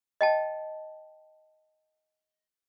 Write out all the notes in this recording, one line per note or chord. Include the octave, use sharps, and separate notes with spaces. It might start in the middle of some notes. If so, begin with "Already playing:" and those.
D#5 G5 A5